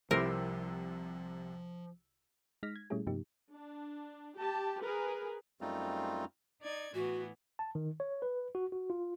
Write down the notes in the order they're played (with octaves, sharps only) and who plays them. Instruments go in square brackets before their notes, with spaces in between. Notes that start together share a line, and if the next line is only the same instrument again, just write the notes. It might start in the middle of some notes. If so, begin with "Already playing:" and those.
[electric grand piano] C2 C3 E6 [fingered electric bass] F3 [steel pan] E4 G4 C5 [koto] A#4
[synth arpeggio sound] G#3 D#4 F6 A#6 B6
G#6
A#2 G3 A3 C#4 E4 G#4
G2 C3 F3 A#3 D#4 G4
[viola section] D4
G4 A5
G#4 A#4 B4
[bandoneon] F#2 G3 A3 C4 D#4 F4
[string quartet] D#4 D5 G#6
[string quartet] A2 E3 B3 [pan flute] F#4
[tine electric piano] A5
D#3
C#5
B4
F#4
F#4
F4